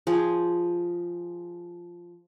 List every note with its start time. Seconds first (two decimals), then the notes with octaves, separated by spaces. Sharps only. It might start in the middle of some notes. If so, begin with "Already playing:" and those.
0.07 F3 G#4